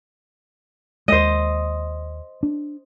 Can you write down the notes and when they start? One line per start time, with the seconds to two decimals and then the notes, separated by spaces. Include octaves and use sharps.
1.08 D#2 G#3 C5 D#5
2.43 D4